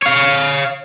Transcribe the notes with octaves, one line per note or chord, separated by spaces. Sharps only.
C#5 F5